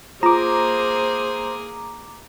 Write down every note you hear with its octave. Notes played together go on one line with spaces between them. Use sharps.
A#3 F4 G#4 C5 A#5 D6